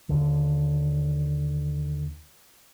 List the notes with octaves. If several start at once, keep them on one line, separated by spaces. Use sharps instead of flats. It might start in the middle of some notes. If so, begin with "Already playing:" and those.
D#2 D3